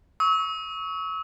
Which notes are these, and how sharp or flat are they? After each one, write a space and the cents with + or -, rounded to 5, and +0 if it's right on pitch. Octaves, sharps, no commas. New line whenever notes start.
C#6 +15 E6 -40